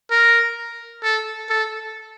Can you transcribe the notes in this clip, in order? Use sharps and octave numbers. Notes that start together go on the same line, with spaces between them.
A#4
A4
A4